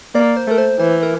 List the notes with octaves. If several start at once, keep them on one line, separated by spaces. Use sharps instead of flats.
A#3 D5
C5
A3 A#4
C5
E3 C5
A#4